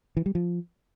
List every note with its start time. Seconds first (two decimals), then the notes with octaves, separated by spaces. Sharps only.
0.17 E3
0.26 G3
0.35 F3